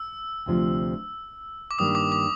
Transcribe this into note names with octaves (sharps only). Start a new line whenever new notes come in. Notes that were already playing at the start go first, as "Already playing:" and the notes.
Already playing: E6
D2 C3 F3
D6
G2 D#3 G3 A#3 D#6
D6
D6